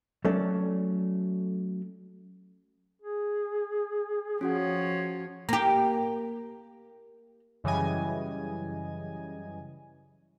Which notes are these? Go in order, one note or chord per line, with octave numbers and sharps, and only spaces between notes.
F#3 A3 C#4 A4 D5
G#4
F3 C#4 F#4 C#5 F#5
A#3 G4
F#2 C#3 E3 G3 D#5 G#5